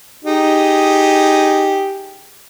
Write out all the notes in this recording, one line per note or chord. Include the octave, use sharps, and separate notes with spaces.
D#4 G4 G#4